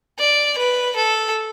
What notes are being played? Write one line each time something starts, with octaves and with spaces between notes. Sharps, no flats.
D5
B4
A4